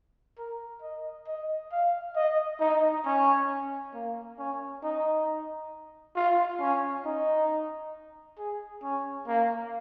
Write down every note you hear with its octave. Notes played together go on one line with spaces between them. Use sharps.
A#4
D#5
D#5
F5
D#5
D#4
C#4
A#3
C#4
D#4
F4
C#4
D#4
G#4
C#4
A#3